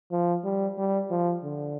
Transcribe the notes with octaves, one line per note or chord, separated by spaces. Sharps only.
F3
G3
G3
F3
D3